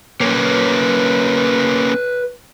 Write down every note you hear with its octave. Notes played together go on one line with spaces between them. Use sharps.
A#3 C#4 B4 C#5